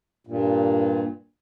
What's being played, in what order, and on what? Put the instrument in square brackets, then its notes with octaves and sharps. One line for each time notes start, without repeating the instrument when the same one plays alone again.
[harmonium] G2 A#2